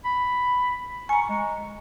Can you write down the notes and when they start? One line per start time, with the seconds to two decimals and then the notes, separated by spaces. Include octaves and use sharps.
0.05 B5
1.09 G#5 A#5 C#6
1.29 G#3